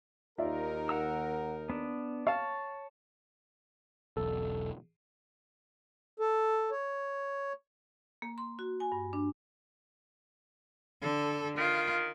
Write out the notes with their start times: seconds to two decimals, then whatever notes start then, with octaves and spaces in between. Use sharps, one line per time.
0.38 D#2 D#4 F4 A#4 D5 E5
0.89 F#5 A#5 E6
1.70 B3 D4
2.27 C#5 F5 A5
4.17 E1 B1 A4
6.19 A4
6.71 C#5
8.22 A#3
8.38 C6
8.59 F#4
8.80 G#5
8.92 G2
9.13 D4
11.02 D3 A4
11.57 D#3 F4